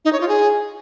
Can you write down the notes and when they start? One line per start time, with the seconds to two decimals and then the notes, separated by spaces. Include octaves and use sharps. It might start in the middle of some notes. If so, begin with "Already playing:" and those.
0.05 D#4
0.13 C#5
0.21 F4
0.28 G#4